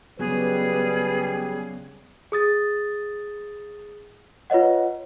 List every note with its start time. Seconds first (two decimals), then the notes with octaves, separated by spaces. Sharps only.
0.19 C#3 F#3 G3 B3 G#4 B4
2.32 G#4 D#6 A6
4.50 F4 B4 C#5 D#5 F#5